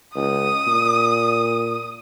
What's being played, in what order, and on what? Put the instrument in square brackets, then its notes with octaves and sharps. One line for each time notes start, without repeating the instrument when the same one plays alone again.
[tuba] C#2 [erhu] D#6
[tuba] A#2